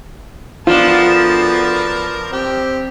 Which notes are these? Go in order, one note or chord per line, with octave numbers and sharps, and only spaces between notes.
D2 F3 B3 D4 F4 A#4 B4 A5
C4 G4